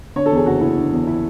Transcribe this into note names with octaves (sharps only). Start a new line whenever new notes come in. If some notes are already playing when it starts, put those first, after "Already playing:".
D3 C#5
A4
E2 G#4
F#1 F#4
F#1 E4
D3
E2
E4